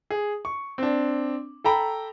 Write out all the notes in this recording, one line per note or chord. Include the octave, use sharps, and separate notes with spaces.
G#4
C#6
C4 D4
A4 G5 A#5 B5